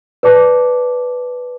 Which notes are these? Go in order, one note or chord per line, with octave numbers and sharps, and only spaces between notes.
B4 D5 A5 D6